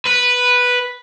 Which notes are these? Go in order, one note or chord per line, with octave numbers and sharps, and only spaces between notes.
B4